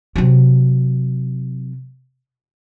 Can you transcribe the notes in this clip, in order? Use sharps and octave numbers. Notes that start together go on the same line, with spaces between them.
C3 F#3